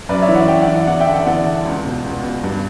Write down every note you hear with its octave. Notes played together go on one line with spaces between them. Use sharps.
F#2 B4 D5
C#5 E5
E3
D5 F#5
F#2 E5 G5
D5 F#5
E3
D5 F#5
E2 D5 F#5
E5 G5
D3
D5 F#5
E2 D5 F#5
D3
C#2
B2
C#2
B2
G2